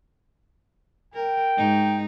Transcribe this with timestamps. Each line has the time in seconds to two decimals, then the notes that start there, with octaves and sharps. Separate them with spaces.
1.14 A#4 G5
1.58 G#2 D#4